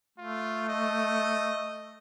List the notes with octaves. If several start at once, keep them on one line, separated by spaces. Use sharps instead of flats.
A3 F4
D#5